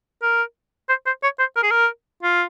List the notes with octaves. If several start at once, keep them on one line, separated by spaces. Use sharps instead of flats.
A#4
C5
C5
C#5
C5
A#4
G#4
A#4
F4